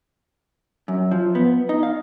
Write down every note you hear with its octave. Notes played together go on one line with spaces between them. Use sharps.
F#2
F3
B3
D#4
F5